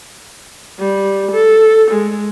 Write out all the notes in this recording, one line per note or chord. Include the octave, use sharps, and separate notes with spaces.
G3
A4
G#3